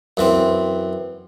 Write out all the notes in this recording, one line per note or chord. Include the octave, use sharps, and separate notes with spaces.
F#2 E3 C4